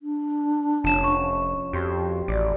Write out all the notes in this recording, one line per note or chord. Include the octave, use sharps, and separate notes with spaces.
D4
F1 F3 C#4 A5 E7
C#6
F2 F#4 G4 C6
A1 D5